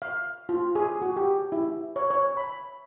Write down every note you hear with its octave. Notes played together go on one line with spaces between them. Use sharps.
F5
F4
G#4
F#4
G4
E4
C#5
C#5
B5